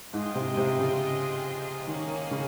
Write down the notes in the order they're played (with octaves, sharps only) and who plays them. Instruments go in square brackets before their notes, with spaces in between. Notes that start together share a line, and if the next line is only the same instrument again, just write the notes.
[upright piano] G#2 [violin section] F4 G#4 C5 D#5 G5
[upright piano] C3
C3
C#3
[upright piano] D#3 [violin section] A#3 C#4 G#4
[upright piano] C#3